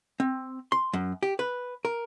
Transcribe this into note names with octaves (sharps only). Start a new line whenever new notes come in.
C4
C6
F#2
G4
B4
A#4